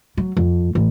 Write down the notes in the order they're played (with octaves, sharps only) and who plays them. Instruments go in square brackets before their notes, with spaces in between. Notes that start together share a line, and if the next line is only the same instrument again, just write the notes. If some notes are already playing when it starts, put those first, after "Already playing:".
[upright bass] F#3
F2
A1